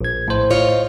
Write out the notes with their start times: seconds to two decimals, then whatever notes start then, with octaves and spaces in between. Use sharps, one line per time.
0.01 A#1 G#6
0.28 A2 C5
0.50 F4 C#5 D#5